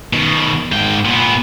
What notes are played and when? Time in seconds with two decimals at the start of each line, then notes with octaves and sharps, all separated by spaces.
0.13 B2 D#3
0.72 G#2 G5
1.05 A#2 B3